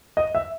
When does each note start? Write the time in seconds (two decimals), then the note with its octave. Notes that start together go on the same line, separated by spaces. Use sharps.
0.17 D#5
0.35 E5